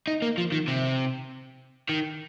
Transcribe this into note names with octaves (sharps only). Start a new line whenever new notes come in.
D#4
A#3
F3
D#3
C3
D#3